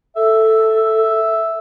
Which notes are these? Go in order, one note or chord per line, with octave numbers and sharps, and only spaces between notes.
A4 E5